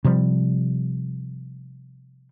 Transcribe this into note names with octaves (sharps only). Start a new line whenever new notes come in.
C3 F3 G3